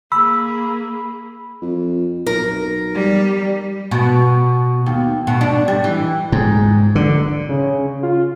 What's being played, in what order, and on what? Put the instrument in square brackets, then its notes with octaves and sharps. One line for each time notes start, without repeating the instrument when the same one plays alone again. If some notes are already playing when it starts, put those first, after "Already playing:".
[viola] A#3 G#4 [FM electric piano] B5 [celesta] E6
[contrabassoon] F2
[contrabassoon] B1 [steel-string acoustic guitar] A#4
[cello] G3
[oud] B2
D#2
B2
D4
G3
E3
[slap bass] G#2
D3
[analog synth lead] C#3
F4